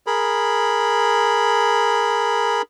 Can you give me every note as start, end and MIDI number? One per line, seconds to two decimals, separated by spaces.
0.07 2.62 68
0.07 2.62 70
0.07 2.62 83